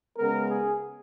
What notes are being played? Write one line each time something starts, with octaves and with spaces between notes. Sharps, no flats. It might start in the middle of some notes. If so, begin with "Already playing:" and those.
C#3 G#3 B3 A#4
G#4